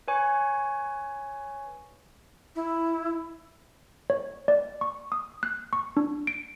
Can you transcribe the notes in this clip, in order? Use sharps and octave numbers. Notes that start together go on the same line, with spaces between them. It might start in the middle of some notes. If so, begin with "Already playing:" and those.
B4 C#5 G#5 C#6
E4
C#5
D5
C#6
D#6
F#6
C#6
D4
D7